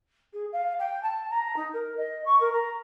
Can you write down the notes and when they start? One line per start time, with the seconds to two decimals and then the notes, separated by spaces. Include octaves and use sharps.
0.33 G#4
0.52 F5
0.79 G5
1.03 A5
1.30 A#5
1.56 D#4
1.73 A#4
1.97 D#5
2.26 C#6
2.40 A#4
2.53 A#5